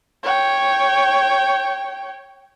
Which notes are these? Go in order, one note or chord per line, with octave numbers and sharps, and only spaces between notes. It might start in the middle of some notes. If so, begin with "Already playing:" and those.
C#5 G5